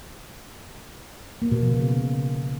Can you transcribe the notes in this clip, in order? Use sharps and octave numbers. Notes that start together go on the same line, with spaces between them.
A#3
B2
F3
C#3